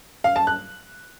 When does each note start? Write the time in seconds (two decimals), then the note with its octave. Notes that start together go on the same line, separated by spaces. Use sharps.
0.24 F5
0.36 A5
0.47 F#6